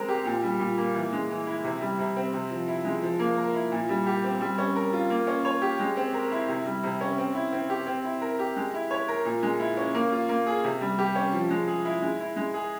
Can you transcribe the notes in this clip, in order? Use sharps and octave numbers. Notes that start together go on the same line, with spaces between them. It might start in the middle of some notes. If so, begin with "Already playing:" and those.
Already playing: G#3 C4 A#4
G4
A#2
G3
A#2
A#3
E3
G#3
E3
E4
C3
G3
C3
C4
C3
F3
E4
G#3
F3
A#3
A#4
E4
A#2
G3
G4
C4
G3
C#4
A#4
F4
A#3
C#4
C#5
G4
G#3
C4
A#4
E4
C3
G3
C3
C#4
C4
E4
C4
G4
C4
E4
A#4
G4
G#3
E4
C#5
A#4
A#2
G#3
E4
C#4
A#3
F4
A#3
G#4
C3
G3
G4
C#4
F3
G#3
G#4
E4
G#3
E4
G#3
G#4